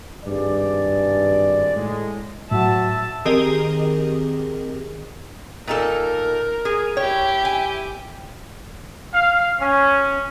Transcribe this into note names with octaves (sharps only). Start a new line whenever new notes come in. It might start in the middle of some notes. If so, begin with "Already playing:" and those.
G#1 G2 G#3 G#4 D5
A2 G#3
A2 F#3 E5 A5
D#3 C4 G4 G#4 A#4 D#5
A#2 D#4 A4 A#4
G#4
E4 G4 C#5
G#5
F5
C#4